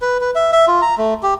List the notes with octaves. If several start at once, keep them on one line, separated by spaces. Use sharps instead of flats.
B4
B4
E5
E5
F4
A#5
A3
G4